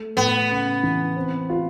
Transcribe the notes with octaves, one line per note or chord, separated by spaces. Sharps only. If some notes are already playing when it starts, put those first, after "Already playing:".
Already playing: A3
A2 B3
C#3
E3
C4
F4